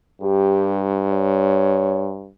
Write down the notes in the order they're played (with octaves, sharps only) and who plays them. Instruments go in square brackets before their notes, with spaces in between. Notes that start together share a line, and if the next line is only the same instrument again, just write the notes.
[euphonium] G2 [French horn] G4
[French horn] C#5